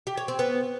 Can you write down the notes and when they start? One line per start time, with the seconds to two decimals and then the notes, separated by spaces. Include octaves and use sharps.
0.07 G4
0.18 C#5
0.28 C4
0.39 B3